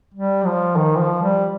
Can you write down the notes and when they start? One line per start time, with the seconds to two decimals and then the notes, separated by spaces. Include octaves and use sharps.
0.14 G3
0.46 F3
0.76 D#3
0.99 F3
1.23 G3